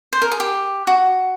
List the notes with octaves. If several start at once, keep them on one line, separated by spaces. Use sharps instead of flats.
C5
A#4
G#4
G4
F#4